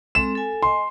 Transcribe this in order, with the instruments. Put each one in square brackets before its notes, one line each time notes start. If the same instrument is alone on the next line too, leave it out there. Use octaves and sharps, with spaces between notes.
[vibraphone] G#3 C4 A4 [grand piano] E7
[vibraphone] A4 G#5
[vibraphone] D#5 G#5 [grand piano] C6